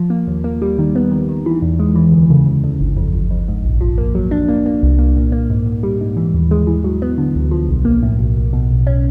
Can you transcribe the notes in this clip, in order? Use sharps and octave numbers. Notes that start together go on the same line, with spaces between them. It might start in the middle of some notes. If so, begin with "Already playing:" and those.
Already playing: F3
A#3
D#2
A#3
G3
D#3
B3
D#3
D#3
E3
E2
G#3
E3
D2
C#3
D2
D2
G1
F2
G1
F2
G#2
A#1
F3
A#3
F#3
D4
A#3
A#3
C2
A#3
A#2
A#3
G#2
G#2
G3
G#2
E3
D#2
G#3
E3
F#3
B3
D3
D2
F3
B1
A#3
A2
B1
B1
B2
B1
C#4